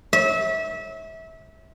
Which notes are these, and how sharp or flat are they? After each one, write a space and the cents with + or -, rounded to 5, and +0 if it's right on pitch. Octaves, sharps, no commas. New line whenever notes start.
E5 -25